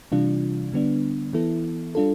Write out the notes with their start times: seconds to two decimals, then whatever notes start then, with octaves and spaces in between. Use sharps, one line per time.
0.12 C3 E3 G3 D4 F4
0.72 D3 G3 B3 D4
1.33 E3 B3 E4 A4
1.95 G3 D4 F4 A4